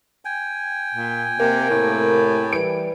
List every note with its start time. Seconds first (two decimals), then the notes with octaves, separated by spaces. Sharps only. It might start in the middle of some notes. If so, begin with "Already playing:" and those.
0.25 G5 G#5
0.95 A#2
1.39 C3 A#3
1.70 A2 C3 A3 A#4
2.53 E3 G3 B4 D7